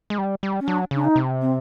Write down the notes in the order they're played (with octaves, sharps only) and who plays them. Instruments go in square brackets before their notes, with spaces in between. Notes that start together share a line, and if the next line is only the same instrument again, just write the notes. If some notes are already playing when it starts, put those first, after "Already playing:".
[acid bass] G#3
G3
G3
[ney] C#4
[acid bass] F#3 [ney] D4
[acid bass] C#3 [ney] D4
[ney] D#4
[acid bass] C3
[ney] C4